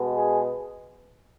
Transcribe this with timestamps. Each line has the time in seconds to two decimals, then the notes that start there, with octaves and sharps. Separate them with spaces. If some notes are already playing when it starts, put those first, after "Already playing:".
Already playing: B2 G#3 B3
0.16 G#4